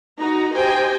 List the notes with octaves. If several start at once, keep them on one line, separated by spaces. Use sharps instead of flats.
D#4 F#4 A#5
G4 C5 D#5 G5 G#5